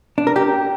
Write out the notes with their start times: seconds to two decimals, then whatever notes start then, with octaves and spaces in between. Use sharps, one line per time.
0.18 D4
0.27 A#4
0.36 G4